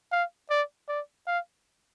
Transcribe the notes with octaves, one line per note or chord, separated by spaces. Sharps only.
F5
D5
D5
F5